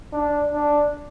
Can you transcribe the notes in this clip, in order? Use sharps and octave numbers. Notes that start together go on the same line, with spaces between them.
D4
D4